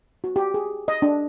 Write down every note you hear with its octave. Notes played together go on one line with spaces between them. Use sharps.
F#4
G4
G#4
D#5
D4